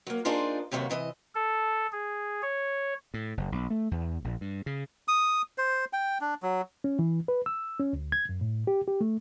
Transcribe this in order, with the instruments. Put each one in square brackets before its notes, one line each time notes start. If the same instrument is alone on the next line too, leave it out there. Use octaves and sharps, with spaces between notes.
[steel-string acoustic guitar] F#3 A#3
D4 D#4 F4 G#4 A#4 C5
D#2 C3 F#3 G#3 A#3 B3
C3 E3 D#5
[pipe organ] A4
G#4
C#5
[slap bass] A2
F#1
B1
A3
E2
A#1
G2
C#3
[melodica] D#6
C5
G5
D4
F#3
[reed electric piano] C#4
E3
B4
E6
C#4
D2
G#6
F#2
A2
G4
G4
A3